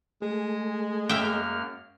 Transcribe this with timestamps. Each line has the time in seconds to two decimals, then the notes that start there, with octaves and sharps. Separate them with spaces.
0.22 G#3 A3 G#4
1.09 F#2 A#3 E5 G5 F6